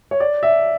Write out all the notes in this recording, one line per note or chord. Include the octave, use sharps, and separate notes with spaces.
C#5
D5
E5